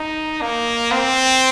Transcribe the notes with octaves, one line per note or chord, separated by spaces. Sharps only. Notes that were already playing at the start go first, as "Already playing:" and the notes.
Already playing: D#4
A#3
C4